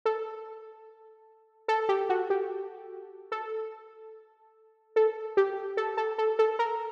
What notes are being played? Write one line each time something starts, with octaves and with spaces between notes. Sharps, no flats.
A4
A4
G4
F#4
G4
A4
A4
G4
A4
A4
A4
A4
A#4